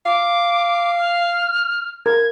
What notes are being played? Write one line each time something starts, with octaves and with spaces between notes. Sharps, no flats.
F5 D6
F6
A#4 G#6